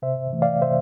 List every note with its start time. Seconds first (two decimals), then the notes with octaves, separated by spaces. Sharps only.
0.02 C3 C5 E5
0.33 E3 A3
0.42 D5 F5
0.62 C3 C5 E5